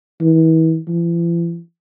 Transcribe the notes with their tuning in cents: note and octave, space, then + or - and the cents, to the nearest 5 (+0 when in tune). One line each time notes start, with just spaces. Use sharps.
E3 -35
E3 +45